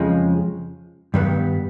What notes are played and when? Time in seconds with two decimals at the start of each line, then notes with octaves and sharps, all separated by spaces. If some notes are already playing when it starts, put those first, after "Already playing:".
Already playing: F2 C#3 F3 G#3
1.14 G2 D#3 G3 B3